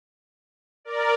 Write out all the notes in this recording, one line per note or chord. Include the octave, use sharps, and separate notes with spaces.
A#4 D5